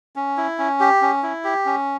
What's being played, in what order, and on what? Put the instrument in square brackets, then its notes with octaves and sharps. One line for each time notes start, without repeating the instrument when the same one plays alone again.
[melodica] C#4
E4
C#4
G4
C#4
E4
G4
C#4